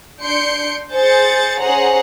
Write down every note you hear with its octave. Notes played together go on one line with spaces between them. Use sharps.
D4 C6 G6 C#7 D7
G#4 C5 G6 A6 C#7
C#4 G#4 C5 F#5 A#5